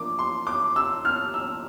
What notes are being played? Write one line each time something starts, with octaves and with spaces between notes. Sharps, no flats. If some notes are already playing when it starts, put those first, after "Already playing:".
Already playing: F3 A#3 D4 F4 D6
C6
D6
E6
F6
E6